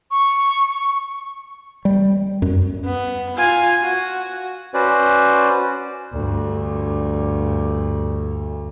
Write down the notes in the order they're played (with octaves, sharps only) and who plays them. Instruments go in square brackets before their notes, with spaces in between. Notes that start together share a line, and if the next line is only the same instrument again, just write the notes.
[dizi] C#6
[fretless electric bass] G3
F#2
[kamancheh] B3
F4 G#5
F#4
[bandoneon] C#4 F#4 B4 C5 D5
[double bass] D2 G2